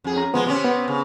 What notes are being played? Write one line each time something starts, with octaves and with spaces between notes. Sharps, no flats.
F2 G#4
C#4 A#5
F3 G#3 B3
C3 C4 C#4
B3
C#3